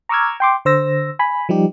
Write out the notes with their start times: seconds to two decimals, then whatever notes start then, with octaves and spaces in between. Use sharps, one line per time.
0.09 A#5 C#6 D6 E6 F6 G#6
0.40 G5 C6 D6
0.65 D3 C5 E6 A#6
1.19 G#5 B5
1.49 F3 G3 D#4 G4